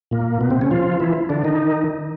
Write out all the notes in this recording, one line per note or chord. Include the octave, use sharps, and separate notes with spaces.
A#2 A#3
B2 B3
C3 C4
C#3 C#4
F3 F4
E3 E4
D3 D4
D#3 D#4